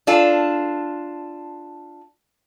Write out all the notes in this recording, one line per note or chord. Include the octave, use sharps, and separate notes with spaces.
D4 F4 A4